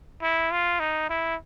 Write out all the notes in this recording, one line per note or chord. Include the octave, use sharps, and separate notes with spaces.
E4
F4
D#4
E4